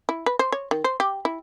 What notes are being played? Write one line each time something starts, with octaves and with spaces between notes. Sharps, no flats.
E4
B4
C5
C#5
D#3
C5
G4
E4